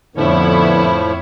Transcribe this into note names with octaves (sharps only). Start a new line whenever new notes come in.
F2 A2 D3 F3 B3 E4 C#5